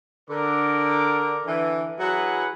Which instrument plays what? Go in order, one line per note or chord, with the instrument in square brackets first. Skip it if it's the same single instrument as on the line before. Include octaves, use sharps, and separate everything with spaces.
[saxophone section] D3 [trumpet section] A#4 D6
[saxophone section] D3 E3
[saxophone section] F#3 F#5 [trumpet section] E4 G#4 B4